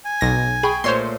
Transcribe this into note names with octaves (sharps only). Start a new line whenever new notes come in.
G#5
B1 A#6
G#4 G5 B5 C#6
A#2 A3 C5 C#5 C6